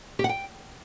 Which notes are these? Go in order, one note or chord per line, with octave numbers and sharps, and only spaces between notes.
G4
F#5
G5